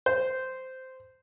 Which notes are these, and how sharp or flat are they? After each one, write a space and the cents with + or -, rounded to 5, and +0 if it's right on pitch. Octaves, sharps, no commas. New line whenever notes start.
C5 -10